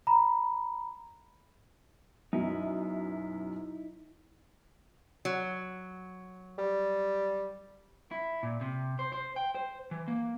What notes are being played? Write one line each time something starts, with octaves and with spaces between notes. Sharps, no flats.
A#5 B5
F#2 B2 D#4 E4
F#3
G3
E4
A#2
C3
C5
C5
G5
C5
E3
A#3